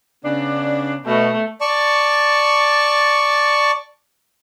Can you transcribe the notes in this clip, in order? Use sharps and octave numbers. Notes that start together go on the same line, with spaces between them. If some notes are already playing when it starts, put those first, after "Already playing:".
C#3 B3 D4
B2 A3
D5 A5 C#6